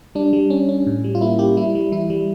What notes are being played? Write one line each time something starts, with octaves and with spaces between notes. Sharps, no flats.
G3 D4
G3
C#4
C#4
A2
G3
F4
A#3 E4
A#3 G4
G3 E4
G3
E3 E4
G3